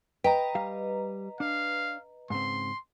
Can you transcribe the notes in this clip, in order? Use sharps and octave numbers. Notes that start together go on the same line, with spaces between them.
B4 D#5 G5 A#5
G3 F5
D4 F5
G#2 C#3 C4 C6